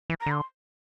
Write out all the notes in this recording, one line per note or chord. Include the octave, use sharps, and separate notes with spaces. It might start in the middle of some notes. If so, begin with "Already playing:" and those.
E3
A#5
D3 C6